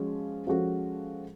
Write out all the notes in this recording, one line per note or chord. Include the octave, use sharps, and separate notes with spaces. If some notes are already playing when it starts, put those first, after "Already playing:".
Already playing: F3 G#3 C#4 F#4
F3 G#3 C#4 F#4 A4